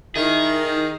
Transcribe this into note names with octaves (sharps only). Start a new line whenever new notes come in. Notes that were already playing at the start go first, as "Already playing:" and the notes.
D#3 E4 G#4